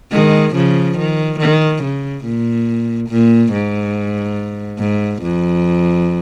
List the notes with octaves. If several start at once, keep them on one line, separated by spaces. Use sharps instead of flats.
D#3 G#3
C#3 F3
D#3
D#3
C#3
A#2
A#2
G#2
G#2
F2